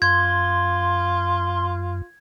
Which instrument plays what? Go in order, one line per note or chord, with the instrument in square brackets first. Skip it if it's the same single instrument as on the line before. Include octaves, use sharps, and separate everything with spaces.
[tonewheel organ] F#2 [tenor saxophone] F4 [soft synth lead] C6 [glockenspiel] G#6